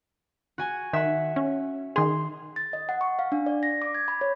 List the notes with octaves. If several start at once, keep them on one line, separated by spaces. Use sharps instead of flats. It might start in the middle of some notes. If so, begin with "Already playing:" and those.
F#4 G#5
D#3 E5 F#5
C#4
D#3 G#4 C6
A6
D#5
F#5
C#6
F5
D4
D5
A#6
D6
G#6
B5
C#5